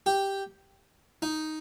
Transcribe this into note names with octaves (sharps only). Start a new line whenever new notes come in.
G4
D#4